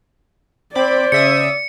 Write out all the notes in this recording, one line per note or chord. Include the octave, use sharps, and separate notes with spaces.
C4 C5 D5 B5 D6
C#3 E5 D#6 C#7